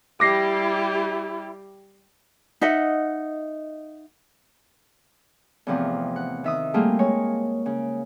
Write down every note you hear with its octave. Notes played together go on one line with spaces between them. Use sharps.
G3 E4 G4 D6 A#6 C7
D#4 D#5 E5 F#5
E2 A2 C3 F3
F#5
D#3 E5 D#6
G3 A3 A#3 F4 G#4
G#3 C#5
C#3